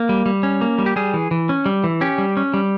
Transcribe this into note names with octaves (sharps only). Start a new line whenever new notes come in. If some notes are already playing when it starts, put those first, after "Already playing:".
Already playing: A#3
G3
G3
C#4
A#3
G3
G4
G3 G#4
E3
E3
C#4
G3
E3
C#4 G4
G3
C#4
G3